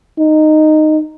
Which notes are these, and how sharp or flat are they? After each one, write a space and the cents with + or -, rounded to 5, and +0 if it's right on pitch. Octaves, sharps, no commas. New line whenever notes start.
D#4 -10